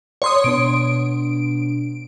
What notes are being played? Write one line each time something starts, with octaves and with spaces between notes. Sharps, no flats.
C#5 C6 D#6
B2 B3 D4 D7